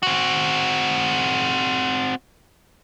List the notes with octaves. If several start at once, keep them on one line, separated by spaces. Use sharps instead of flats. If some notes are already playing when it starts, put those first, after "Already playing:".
C4 F#4